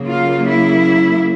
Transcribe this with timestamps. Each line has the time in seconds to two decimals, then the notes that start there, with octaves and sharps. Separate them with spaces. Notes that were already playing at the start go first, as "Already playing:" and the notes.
Already playing: C#3 F#3 A#3
0.08 F4
0.48 E4